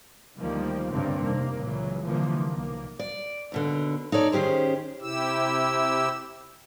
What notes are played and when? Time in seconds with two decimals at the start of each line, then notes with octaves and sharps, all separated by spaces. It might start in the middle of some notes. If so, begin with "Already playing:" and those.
0.37 D2 D#3 F3 G3 A#3
0.90 D2 G2 C#3 G3 A#3 C4
1.19 F1 C3 D#3 A#3
1.55 C#2 A#2 C#3 E3 F#3
2.04 C2 D3 E3 F3 A#3
2.52 B1 A#3
2.99 D5
3.52 D#2 B2 D3
4.12 D#4 A4 C#5 D5
4.32 D#3 C#4 G4 G#4 C5
5.01 C3 E4 G4 E6